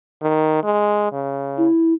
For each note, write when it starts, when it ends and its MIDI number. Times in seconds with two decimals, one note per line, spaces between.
0.22 0.60 51
0.63 1.08 56
1.12 1.66 49
1.57 1.94 64